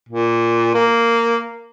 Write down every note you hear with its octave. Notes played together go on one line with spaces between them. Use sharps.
A#2
A#3